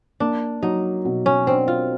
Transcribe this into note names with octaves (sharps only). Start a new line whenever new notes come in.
A#3 D4
F#3 D#4
B2
C#4
C4 D4
F4